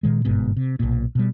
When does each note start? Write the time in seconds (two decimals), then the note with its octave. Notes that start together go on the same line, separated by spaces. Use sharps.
0.03 A#2 D#3 G#3
0.25 G1 G#2 B2
0.56 C3
0.79 B1 A#2
1.15 B2 G3